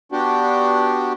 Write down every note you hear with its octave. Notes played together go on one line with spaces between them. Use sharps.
B3 D4 F#4 G4